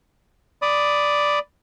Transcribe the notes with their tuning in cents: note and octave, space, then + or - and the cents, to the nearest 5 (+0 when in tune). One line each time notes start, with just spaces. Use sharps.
D5 +0 B5 +10 D#6 -5